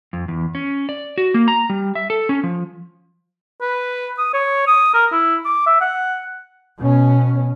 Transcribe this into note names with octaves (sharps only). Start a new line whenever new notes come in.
F2
E2
C#4
D5
F#4
A#3
A#5
G3
E5
A4
C#4
F3
B4
D#6
C#5
D#6
A#4
E4
D6
E5
F#5
B2 C#4